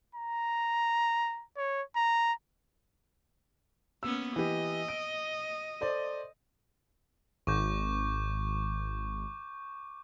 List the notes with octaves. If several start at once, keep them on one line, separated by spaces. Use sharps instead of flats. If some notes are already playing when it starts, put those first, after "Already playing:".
A#5
C#5
A#5
A#3 B3 C#4 E6
E3 G4 D#5
D7
A4 C5 D5
G#1 C#6 D6 G6